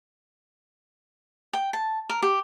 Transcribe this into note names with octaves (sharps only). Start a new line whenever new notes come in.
G5
A5
A#4
G4